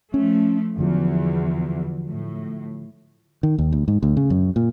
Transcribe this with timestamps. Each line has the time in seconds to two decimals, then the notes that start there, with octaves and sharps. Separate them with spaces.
0.14 F3 A3 C#4
0.78 E2 D3 F3 F#3
2.09 A2
3.43 D#3
3.58 D#2
3.72 D2
3.88 G#2
4.03 D2
4.17 C#3
4.30 F#2
4.56 A#2